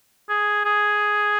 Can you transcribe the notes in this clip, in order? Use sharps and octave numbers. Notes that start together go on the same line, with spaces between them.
G#4
G#4